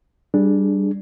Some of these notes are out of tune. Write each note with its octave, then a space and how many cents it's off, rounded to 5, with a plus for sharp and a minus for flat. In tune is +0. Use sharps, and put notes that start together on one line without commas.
G3 +0 D4 +0 G#4 +15